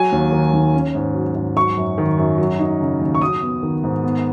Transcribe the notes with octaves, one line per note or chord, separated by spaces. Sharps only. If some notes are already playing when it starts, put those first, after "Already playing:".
Already playing: F#3 G#5
D#2
D#3
D#2
C#4
G#2
F#3
G#2
F#3 C#6
F#2
D#3
F#2
F#3
D#4
C#3
D#2
C#6
F#3 D#6
B3
D#3
G#2
B3